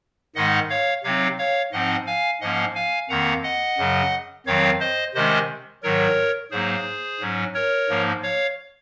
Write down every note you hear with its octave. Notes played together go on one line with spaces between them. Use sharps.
G#2 D#3 G#3 D#4 D#5 F#5
C#5 F5
C3 F#3 C4 D#4 C#5 F5
C#5 F5
G#2 F3 C4 D#4 D#5 F#5
F5 G#5
G#2 F3 A#3 C#4 D#5 F#5
F5 G#5
F2 D#3 A#3 F#5 A#5
D#5 F#5
F#2 C#3 F#3
F2 D#3 F#3 C4 C#5 F5
C5 D#5
C3 D#3 G#3 C#4 C5 D#5
G#2 D#3 F#3 A#4 C#5
G#2 F#3 A#3 D#4 G#4 C5
G#2 F#3 C#4
A#4 C#5
G#2 F3 A#3 D#4
C#5 F5